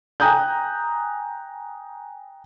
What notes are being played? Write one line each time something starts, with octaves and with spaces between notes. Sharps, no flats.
G5 G#5 A#5 D#6 F#6 G6